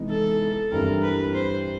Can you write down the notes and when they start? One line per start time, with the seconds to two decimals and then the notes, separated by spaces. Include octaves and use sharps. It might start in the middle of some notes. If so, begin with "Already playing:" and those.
Already playing: C3 E3 G#3 B3 D#4
0.10 A4
0.72 G2 E3 G3 C4 A#4
1.02 B4
1.34 C5